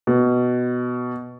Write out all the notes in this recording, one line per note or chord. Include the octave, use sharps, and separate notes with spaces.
B2